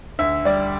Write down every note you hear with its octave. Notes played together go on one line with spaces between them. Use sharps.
D2 E5
G3 D5